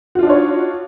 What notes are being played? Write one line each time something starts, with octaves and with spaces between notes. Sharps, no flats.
D4 D#4 F4 F#4 C#5